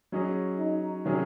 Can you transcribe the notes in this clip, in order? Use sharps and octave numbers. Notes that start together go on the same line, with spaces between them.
F#3 C#4 G#4 D#5
D#4
C3 D#3 F#3 C#4 G#4